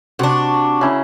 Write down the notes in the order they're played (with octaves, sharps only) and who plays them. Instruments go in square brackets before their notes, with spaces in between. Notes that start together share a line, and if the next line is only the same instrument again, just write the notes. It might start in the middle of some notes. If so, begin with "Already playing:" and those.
[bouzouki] C3 D4 [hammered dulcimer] F#4 C#6
[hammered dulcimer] C#3 E4 A#5